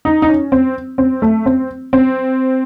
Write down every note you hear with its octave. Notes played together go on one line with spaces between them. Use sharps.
D#4
D#4
C#4
C4
C4
A3
C4
C4